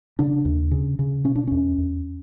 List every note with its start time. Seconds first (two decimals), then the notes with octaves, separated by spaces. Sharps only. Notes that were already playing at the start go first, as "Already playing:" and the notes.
0.19 C#3 D4
0.45 D#2
0.71 C#3
0.99 C#3
1.24 B2 C#4
1.36 D4
1.47 E2 C#4
1.78 E2